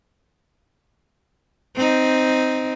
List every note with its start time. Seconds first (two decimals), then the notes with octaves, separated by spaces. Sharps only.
1.76 C4 D#4